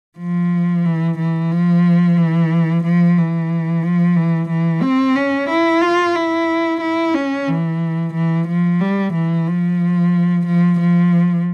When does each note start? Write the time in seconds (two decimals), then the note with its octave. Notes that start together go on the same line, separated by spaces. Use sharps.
0.18 F3
0.85 E3
1.18 E3
1.52 F3
2.17 E3
2.84 F3
3.17 E3
3.83 F3
4.17 E3
4.49 E3
4.82 C4
5.16 C#4
5.50 E4
5.82 F4
6.15 E4
6.81 E4
7.14 C#4
7.48 E3
8.14 E3
8.48 F3
8.80 G3
9.13 E3
9.47 F3
10.46 F3
10.79 F3